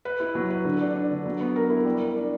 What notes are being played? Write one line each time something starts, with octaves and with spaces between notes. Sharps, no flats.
B4
E4
F#3
B4
D3
D4
D4
D3
F#3
B3
A#4
E4
G3
A#4
D4